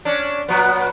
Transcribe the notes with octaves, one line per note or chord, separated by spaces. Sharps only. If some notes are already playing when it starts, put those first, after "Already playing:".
C#4 D4
A#2 F#3 B3